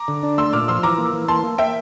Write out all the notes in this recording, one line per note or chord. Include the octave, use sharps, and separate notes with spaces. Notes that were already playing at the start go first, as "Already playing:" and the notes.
Already playing: A#5 D6
D3
D4
A3 C6 E6
A#2 D6 F6
F3 C6 E6
E3 A#5 D6
A#3
E3
A#3 A5 C6
A#3
A#3 E5 G5